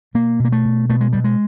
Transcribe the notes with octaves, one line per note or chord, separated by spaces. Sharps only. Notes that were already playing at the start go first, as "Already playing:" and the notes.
B2 A#3
B2
A#3
A3
B2
B2 A3
G#3
B2 G3
G#3